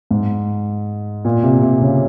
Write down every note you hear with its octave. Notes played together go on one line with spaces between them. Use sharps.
G#2
A#2
C3
C3
C#3